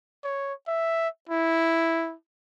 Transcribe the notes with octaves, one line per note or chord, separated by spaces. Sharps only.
C#5
E5
E4